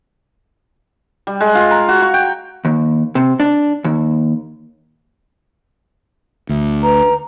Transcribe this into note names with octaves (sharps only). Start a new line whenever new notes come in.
G3
G#3
F4
A#5
F#4
C#6
G5
D#2
C3
D4
D#2
D2
B4 A#5